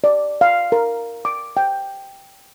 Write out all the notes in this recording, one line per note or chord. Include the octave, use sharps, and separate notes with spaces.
D5
F5
A#4
D6
G5